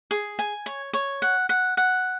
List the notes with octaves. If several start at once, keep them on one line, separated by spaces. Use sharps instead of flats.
G#4
G#5
C#5
C#5
F#5
F#5
F#5